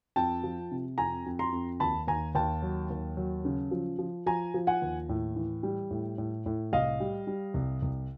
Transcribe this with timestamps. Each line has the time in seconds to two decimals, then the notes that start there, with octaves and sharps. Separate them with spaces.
0.16 F2 G5 A5
0.44 F3
0.71 C3
0.98 F2 G#5 A#5
1.26 F2
1.39 A#5 C6
1.52 F2
1.80 D#2 A5 B5
2.08 D#2 G#5 A#5
2.35 D#2 G5 A5
2.62 F#3
2.90 D#2
3.17 F#3
3.45 C#3
3.71 F3
3.99 F3
4.26 F3 G#5 A#5
4.54 F3
4.67 F#5 G#5
4.82 D#2
5.09 A2
5.36 E3
5.63 G3
5.91 A2
6.18 A2
6.46 A2
6.72 C2 D#5 F5
7.00 G3
7.27 G3
7.54 C2
7.82 C2